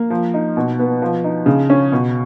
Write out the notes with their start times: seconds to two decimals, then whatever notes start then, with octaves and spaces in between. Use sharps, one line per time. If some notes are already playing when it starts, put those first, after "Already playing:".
Already playing: A#3
0.10 F3
0.34 D#4
0.57 B2
0.79 B3
1.02 F3
1.24 D#4
1.46 C#3
1.70 C#4
1.92 B2